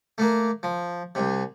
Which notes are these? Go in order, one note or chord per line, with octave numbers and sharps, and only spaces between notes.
A3 A#3
F3
C2 C3